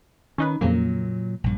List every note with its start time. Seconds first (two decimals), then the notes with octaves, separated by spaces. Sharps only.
0.38 D#3 C#4 D#4 B4
0.61 F2 A#2 C#3 F#3 A#3
1.44 A#1 G2